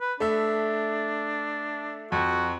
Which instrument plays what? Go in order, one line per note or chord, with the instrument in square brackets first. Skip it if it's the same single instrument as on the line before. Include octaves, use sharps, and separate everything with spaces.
[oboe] B4
[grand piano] A3 E5 [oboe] D4
[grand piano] F2 [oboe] F#4